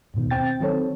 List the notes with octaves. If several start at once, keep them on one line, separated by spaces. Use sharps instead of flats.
D#2 G#2 B2 D#3
C4 G5 A6
D#3 F#3 C4 A4 C#5